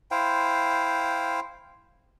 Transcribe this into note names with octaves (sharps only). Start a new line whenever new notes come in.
E4 C5 F5 G5